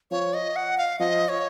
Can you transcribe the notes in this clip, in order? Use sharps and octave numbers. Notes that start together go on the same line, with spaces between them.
F3 C#5
D#5
F#5
F5
F3 D#5
C#5